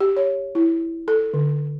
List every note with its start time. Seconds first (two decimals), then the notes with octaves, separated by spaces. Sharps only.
0.01 G4
0.17 C#5
0.55 E4
1.08 A4
1.34 D3